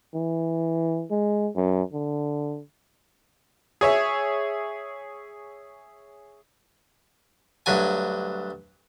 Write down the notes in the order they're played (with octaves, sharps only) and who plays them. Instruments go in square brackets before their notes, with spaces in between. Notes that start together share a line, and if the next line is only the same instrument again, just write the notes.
[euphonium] E3
G#3
F#2
D3
[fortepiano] G#4 C#5 E5
[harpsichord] D2 G2 F#3 G#5